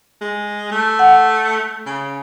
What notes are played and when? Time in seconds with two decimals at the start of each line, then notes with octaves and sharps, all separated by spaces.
0.21 G#3
0.72 A3
0.99 F#5
1.86 C#3